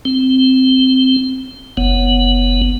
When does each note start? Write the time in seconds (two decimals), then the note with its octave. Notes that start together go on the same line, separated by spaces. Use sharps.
0.05 C4
1.77 F#1 B3